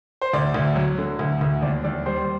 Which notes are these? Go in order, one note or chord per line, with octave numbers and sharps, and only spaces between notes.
C5
D2 D5
D2
F#3
D3
D2
D2
D#2 D5
D#2 D5
G3 C5